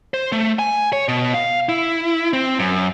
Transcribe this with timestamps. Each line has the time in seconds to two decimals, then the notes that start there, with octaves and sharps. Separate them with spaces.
0.14 C5
0.32 A3
0.59 G#5
0.93 C#5
1.08 B2
1.34 F5
1.69 E4
2.33 C4
2.59 F#2